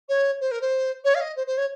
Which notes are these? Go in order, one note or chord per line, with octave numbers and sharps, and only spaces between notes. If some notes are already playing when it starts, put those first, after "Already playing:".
C#5
C5
A#4
C5
C#5
F5
D#5
C5
C5
C#5